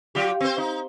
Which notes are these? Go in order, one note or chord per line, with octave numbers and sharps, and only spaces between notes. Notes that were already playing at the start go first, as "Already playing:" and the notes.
F#3 F4 G4
C4 C5
D#4